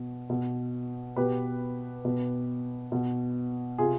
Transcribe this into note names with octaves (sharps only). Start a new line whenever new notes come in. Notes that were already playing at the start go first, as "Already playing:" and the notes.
Already playing: B2
B2
B2 G4 B4
B2
B2
C3 F4 G#4